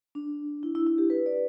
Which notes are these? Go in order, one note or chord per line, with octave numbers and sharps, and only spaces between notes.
D4
E4
E4
E4
G4
B4
D5